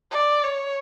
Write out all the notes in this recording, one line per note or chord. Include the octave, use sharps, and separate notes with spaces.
D5
C#5